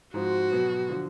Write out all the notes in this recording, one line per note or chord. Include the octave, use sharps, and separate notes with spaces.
G#2 F3 G#3 C4 F#4
B2 F#3 B3
D3 F3